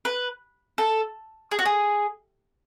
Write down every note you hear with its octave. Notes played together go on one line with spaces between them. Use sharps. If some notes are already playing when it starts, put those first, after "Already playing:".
B4
A4
G#4
F#4
G#4